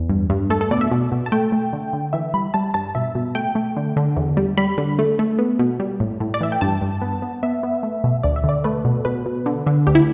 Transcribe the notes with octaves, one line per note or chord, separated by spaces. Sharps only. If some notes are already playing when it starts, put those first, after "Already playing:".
Already playing: E2
G2
G2
A3 A4
A4
B2 D5
E5
B2
B2
A5
A3 G5
A3
D3
D3
E3 E5
G3 B5
G3 A5
G2 A5
B2 E5
B2
A3 G5
A3
D3
D3
E2
G3
G3 B5
D3
A3
A3
B3
B2
G3
A2
A2
D5
E3 E5
G5
G2 A5
G2
B3
B3
B3 E5
B3
A3
B2
D2 D5
E5
D3
D5
A3 B4
B2
B2 B4
B2
D3
D3
D2 G4
E4